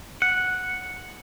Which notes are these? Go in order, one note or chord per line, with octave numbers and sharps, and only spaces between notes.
F#5